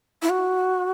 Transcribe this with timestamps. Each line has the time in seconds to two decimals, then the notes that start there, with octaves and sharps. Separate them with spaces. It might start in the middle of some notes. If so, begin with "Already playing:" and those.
0.22 E4
0.30 F#4